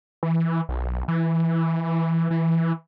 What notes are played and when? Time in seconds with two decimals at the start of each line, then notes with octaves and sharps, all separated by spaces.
0.23 E3
0.69 B1
1.08 E3
2.30 E3